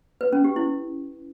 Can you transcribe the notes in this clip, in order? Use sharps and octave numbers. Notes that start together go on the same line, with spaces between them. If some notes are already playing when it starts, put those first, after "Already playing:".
B4
C#4
G4
E4